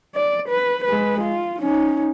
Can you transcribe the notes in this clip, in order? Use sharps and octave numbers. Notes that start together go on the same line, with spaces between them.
D5
B4
G#3 B4
F4
C#4 D#4